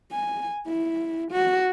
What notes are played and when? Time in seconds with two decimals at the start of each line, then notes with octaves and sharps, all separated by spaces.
0.12 G#5
0.67 E4
1.31 F#4